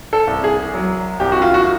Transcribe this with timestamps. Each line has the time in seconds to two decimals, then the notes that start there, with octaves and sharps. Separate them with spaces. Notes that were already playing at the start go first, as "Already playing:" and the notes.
0.13 A4
0.27 C2
0.44 G#4
0.74 F#3
1.20 C2 G4
1.32 F#4
1.42 F4
1.54 F#4